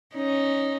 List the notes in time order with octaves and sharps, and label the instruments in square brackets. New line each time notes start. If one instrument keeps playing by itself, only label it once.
[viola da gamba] C#4 D#4